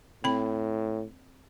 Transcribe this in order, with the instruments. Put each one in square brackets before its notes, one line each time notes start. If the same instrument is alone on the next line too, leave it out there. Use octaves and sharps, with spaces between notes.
[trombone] A2 [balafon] C4 B5